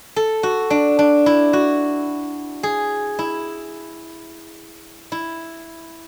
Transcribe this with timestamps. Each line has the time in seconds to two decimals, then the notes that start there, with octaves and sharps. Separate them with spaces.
0.16 A4
0.43 F#4
0.70 D4
0.99 D4
1.26 E4
1.53 F#4
2.63 G#4
3.19 E4
5.12 E4